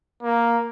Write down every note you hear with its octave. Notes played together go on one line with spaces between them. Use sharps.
A#3